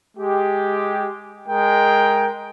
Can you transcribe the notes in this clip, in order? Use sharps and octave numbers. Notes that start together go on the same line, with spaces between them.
G#3 G4
G#3 A#4 G5